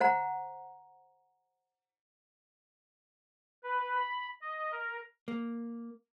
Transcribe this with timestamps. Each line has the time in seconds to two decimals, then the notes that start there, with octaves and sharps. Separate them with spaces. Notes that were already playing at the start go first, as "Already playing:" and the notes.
0.01 C5 F#5 A#5
3.63 B4
3.95 B5
4.41 D#5
4.72 A#4
5.28 A#3